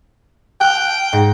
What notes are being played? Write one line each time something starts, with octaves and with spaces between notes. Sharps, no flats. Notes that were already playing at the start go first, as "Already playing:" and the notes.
G5 F6 F#6
G#2 A#6